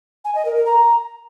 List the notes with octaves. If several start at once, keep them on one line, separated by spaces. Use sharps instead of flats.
G#5
D#5
A#4
A#4
A#5